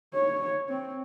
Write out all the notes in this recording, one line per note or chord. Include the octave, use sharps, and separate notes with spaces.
C#5
C4